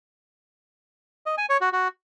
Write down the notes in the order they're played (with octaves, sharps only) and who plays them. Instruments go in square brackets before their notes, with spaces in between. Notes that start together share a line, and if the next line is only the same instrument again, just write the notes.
[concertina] D#5
G#5
C#5
F#4
F#4